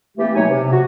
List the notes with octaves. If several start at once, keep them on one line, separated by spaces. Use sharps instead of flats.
E3 A3 A#3 C4 G4
B2 F#3 D#4 C#5 G#5
C3
F#4